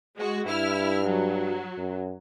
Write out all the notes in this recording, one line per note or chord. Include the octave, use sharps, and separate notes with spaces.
G#3 F#4
G2 E4 F6
F#3
F#2